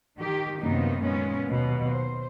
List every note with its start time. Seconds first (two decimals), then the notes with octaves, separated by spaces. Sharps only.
0.18 D#3 G4
0.61 F#2 C3 D#3 A#3 B3 D#4
1.03 A#2 G#3 B3 C#4
1.49 D#2 B2 F#3
1.86 C5